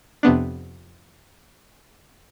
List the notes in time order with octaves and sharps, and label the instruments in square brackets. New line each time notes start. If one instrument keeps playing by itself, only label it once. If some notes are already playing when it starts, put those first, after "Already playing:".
[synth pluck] F2 C3 B3 D4